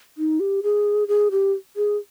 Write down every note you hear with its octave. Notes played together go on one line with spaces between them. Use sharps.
D#4
G4
G#4
G#4
G4
G#4